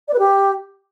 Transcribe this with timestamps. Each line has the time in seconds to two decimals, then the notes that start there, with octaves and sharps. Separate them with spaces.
0.08 D5
0.13 B4
0.18 G4